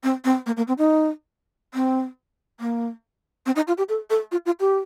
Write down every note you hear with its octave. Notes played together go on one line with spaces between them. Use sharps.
C4
C4
A#3
A#3
C4
D#4
C4
A#3
C4
D#4
F4
G4
A4
A4
F4
F4
G4